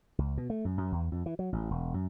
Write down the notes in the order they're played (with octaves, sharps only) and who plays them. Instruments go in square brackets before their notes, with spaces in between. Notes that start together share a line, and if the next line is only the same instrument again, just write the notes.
[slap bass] C#2
B2
A3
F#2
F#2
E2
F2
E3
F#3
A1
E1
F#2